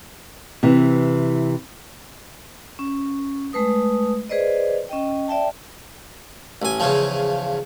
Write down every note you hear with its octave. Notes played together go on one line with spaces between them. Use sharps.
C3 E3
C#4
G#3 A3 B4 D#6
G#4 B4 C5 D5 D#5
C#4 D#5 G5
D5 E5 G5 A5
A1 G#5
E2 C#3 F3